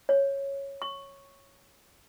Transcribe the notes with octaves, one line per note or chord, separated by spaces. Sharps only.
C#5
C#6